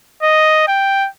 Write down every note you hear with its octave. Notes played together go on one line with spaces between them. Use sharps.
D#5
G5